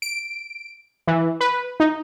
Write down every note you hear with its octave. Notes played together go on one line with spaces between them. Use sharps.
D7
E3
B4
D#4